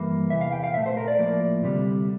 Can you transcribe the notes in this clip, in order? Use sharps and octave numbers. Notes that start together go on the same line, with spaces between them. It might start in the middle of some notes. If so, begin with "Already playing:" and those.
Already playing: G2 E3 G3 A#3
E2 C3 E3 E5
F5
G5
F5
A#2 A3 E5
C5
A#4
D5
A2 F3 A#3
D2 C3 G3